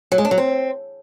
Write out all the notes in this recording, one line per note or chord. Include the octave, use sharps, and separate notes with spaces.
F#3
G#3
D4
F#3
C4